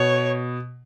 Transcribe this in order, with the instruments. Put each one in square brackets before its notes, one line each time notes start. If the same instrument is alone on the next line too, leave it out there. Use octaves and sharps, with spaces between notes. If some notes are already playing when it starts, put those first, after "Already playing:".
Already playing: [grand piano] B2 [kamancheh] C#5